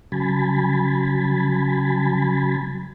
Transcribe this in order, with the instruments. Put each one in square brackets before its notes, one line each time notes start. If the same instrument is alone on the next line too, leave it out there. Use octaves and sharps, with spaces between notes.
[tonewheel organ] C#3 F#3 G#5 A5 B5